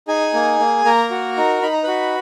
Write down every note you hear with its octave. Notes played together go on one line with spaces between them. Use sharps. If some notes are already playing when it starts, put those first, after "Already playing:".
D#4 G#4 G#5
A#3
A#3
A#3 A#4 A#5
F#4
D#4
D#4 B5
A#5
F#4 B4 B5